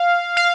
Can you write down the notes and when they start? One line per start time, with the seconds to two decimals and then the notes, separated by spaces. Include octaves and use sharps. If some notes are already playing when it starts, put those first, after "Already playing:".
Already playing: F5
0.37 F5